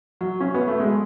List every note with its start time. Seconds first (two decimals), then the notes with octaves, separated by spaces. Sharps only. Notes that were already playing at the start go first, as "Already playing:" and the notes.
0.21 F#3
0.41 C#4
0.54 B3
0.67 A3
0.80 G#3